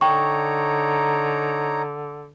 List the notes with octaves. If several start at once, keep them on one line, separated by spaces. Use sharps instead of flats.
D3 D#4 C#5 G5 A#5 C#6